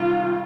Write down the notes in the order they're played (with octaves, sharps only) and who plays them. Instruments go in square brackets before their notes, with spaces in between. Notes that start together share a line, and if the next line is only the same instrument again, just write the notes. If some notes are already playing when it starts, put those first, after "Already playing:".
Already playing: [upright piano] C3 D#3 G3 [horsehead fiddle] F4